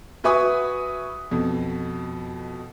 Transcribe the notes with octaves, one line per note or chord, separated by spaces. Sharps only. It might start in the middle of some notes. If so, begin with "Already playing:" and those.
F#4 B4 E5 G#5 C#6 D#6
F2 B2